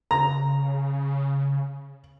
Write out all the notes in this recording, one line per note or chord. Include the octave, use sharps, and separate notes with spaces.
C#3 A#5